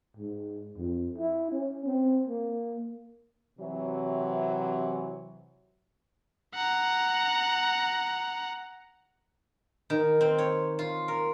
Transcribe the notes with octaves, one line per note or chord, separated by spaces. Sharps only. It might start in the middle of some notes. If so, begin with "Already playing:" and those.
G#2
F2
E4
C#4
C4
A#3
C3 E3 F#3
F#5 A#5
D#3
C4
C#5
F4
A#4